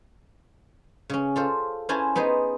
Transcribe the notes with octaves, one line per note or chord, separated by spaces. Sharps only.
C#3 C#4
F4 A4 C5
C#4 E4 C5 G#5 A5
B3 D#4 G#4 C5